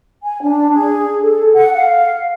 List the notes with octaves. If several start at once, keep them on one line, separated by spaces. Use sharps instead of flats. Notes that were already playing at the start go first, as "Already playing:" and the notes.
G#5
D4
G#4
A4
F#5
F5